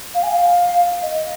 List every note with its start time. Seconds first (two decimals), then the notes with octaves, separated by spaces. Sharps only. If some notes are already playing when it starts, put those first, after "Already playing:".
0.14 F5
0.23 G#5
0.31 F5
1.03 D#5